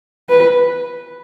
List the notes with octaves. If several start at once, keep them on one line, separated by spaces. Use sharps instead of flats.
B4